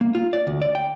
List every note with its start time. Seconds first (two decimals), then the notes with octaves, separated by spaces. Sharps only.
0.01 A#3
0.15 F4
0.33 D5
0.47 D2
0.62 D5
0.75 G5